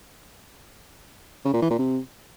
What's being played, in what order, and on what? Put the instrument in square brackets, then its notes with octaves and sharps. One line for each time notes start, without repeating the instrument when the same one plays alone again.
[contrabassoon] C#3
A#2
E3
A#2
C3